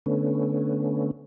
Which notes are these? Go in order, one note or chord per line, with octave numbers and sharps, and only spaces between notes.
D3 A3 B3 C#4